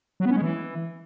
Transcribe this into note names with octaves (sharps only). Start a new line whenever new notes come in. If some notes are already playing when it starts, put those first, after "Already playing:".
F#3
B3
C#4
G#3
E3